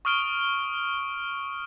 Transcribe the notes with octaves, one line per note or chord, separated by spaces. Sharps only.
C#6 D#6 F6 D7 G7